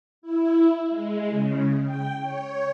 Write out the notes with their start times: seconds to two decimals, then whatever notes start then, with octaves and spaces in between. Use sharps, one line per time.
0.22 E4
0.89 G#3
1.29 C#3
1.85 G5
2.21 C#5